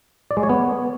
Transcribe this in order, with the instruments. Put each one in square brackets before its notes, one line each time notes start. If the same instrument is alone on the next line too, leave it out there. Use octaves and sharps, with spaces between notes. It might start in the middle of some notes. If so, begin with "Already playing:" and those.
[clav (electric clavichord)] D5
G#3
C#5
B3